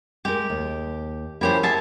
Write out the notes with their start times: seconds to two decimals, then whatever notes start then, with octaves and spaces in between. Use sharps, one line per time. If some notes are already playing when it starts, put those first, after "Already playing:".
0.25 G#3 G4 A#4
0.50 D#2
1.41 F3 C#4 E4 G4 A#4 C5
1.63 G#4 A#4 E5 F#5 A5